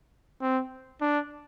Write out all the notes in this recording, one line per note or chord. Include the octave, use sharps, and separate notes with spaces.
C4
D4